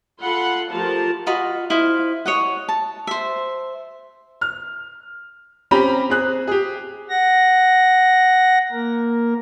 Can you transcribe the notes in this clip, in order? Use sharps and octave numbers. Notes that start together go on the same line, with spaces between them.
F4 A4 F#5 B5 C6
F3 A3 F4 G4 A#4 A5
F4 F#4 D#5 B5
E4 C5 D#5 F5
C#5 D#5 F#5
A5
C5 E5
F6
C4 C#4 G4 A#5 B5
C4 G#4 F#6
G4 G#4
F#5 A#6
A#3 A#4